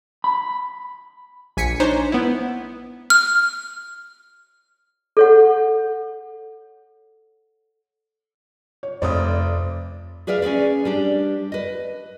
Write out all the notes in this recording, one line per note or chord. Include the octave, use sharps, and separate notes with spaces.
B5
A#1 G#5 B6 C#7
D4 D#4 C5 C#5
B3 E4
F6
A4 C#5 F#5
C#5
F1 F2 C4 D5 D#6
G#4 B4 D5 E5 F5
C#4 G#4 B4 D5
G3 D4 G4
B4 D#5